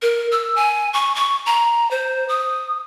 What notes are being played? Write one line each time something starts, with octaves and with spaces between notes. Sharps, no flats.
A#4
E6
G#5
C#6
C#6
A#5
C5
D#6